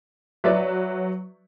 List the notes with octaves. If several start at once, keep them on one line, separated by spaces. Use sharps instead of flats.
F#3 B4 D5 E5